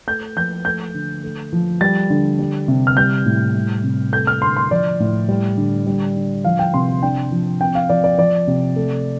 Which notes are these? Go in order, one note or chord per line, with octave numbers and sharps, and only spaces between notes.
A3 G6
F3 G6
A3 G6
D3
A3
F3
G3 A6
D3
G3
C3
F6
G3 G6
A2
G3
C3
A3 G6
F6
D3 C6
C6
F3 D5
A2
G3
D3
G3
D3
F3 F5
G5
C3 C6
D4 G5
F3
C4 G5
F5
F3 D5
D5
F3 D5
C3
A3